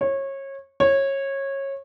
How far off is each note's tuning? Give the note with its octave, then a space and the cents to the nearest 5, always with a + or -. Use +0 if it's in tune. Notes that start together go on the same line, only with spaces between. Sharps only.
C#5 -25
C#5 -20